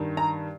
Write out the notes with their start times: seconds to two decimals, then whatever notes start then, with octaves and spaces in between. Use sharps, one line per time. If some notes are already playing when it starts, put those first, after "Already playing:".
Already playing: G2 D#3
0.17 A#5